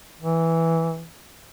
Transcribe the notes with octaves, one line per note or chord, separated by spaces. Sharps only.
E3